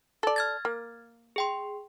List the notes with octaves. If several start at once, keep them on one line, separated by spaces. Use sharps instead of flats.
A4 D5
F6 G#6 A6
A#3
G#4 G5 C6